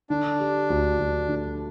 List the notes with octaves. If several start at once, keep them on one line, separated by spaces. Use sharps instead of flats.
D3 D4
G4
D2
D2
D3